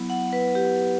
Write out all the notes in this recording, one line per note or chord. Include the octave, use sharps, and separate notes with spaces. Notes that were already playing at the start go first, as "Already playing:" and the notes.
Already playing: F#3 B3 E4
F#5
B4
G4